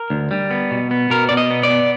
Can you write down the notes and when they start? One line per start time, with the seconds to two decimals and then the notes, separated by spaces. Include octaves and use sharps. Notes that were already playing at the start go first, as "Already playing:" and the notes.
Already playing: A#4
0.10 D2
0.31 G3
0.51 B3
0.71 B2
0.91 B3
1.10 B2 A#4
1.29 B2 D5
1.37 D#5
1.50 B3
1.63 D5
1.70 B3